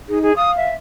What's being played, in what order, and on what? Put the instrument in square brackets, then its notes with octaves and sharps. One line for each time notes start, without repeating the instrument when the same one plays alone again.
[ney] D#4 [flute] G#4
[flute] G#4
[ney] F5 [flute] D#6
[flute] E5